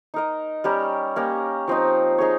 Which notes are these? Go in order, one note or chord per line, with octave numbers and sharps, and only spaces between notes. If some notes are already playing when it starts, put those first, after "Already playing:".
D#4 A#4 D#5
G3 C#4 G4 A#4
A#3 C#4 G4 A#4
F3 C4 D#4
D#4 G#4 C#5